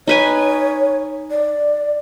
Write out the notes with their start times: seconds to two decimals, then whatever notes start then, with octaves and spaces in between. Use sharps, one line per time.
0.08 D#4 B4 C#5 G#5
1.31 D5